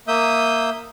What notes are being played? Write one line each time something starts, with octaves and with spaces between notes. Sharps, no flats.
A#3 E5 D#6 G6